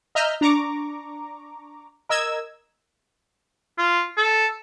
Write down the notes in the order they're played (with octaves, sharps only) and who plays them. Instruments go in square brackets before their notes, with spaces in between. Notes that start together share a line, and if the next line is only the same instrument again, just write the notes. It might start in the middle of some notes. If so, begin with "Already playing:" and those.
[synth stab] D#5 E5 A#5 F6 G6
D4 A#5 C#6 D6
A#4 D#5 E6 G#6
[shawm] F4
A4